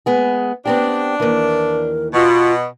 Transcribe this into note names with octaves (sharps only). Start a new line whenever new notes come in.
G#3 B3 G#4
B3 C4 D4 G4
D#2 E3 A#4
B2 F4